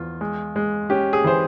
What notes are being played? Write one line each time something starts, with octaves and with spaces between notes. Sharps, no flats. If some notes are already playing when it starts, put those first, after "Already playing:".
Already playing: E2 F3 F4
G#3
G#3
C#4 G4
G#4
E3 C5